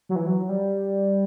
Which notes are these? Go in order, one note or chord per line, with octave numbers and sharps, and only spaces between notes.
F#3
E3
F#3
G3